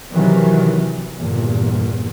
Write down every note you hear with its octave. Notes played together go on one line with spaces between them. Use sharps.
C3 D#3 E3 F#3
G1 E2 A#2